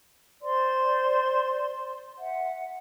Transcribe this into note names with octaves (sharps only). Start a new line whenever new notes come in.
C5 D5 C6
E5 F#5